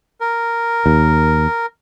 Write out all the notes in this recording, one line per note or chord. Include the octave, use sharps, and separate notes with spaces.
A#4
D#2